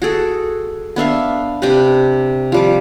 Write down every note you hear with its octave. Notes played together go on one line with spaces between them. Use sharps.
F#4 G#4 A4
B3 D4 E5 F5
C3 D4 G4 B4
F3 G3 D6